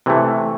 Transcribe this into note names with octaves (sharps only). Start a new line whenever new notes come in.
C3 E3 A3